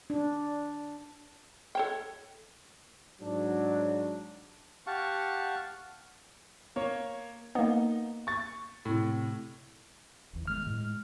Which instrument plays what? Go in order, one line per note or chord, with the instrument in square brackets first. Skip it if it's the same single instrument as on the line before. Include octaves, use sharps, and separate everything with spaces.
[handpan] D4
[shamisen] A4 C#5 G5
[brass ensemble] G#2 F#3 D4
[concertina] G4 F5 F#5 A5 C#6
[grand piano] A#3 C#5
[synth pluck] A#3 B3 [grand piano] D#4
[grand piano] C#6 A6
A2 C3
[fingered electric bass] F1 E2
[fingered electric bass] D#3 G#3 B3 [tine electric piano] F6
[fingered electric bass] A2 G#3